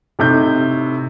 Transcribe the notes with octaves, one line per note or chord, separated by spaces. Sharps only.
A2 C3 D#4 G6